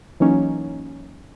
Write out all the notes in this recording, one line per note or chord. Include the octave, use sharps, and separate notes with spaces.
E3 F#3 A#3 C#4 D#4